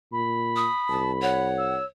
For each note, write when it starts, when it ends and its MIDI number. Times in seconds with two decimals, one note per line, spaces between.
0.12 0.67 46
0.12 1.47 83
0.56 0.99 87
0.89 1.79 36
0.89 1.12 81
1.22 1.85 73
1.22 1.75 78
1.57 1.84 88